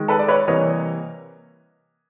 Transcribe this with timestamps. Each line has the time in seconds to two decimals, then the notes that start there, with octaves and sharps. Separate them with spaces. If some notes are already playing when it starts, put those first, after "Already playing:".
Already playing: D#3 G#3
0.08 A4 B4
0.19 D5
0.28 B4 C#5
0.47 C3 E3 G3 A#3 C#5 D#5